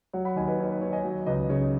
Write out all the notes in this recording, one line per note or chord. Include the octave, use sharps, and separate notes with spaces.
F#3 C#5 F#5
F#5 B5
D#2 D#5 G#5
B4 D#5
D#3 C#5
B4
D#2 C#5
D#5 G#5
F#3
C#2 B4 D#5
C#3 C#5